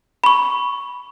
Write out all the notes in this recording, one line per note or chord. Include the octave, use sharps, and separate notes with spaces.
B5 C#6